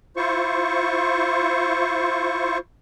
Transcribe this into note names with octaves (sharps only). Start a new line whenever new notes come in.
E4 F4 C5 C#6